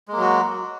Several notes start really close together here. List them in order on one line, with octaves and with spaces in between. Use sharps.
G#3 A#3 F#3 F#4